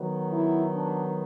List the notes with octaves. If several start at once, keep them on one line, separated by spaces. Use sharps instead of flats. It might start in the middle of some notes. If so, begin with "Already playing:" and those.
Already playing: D#3 F#3 B3
E4
D4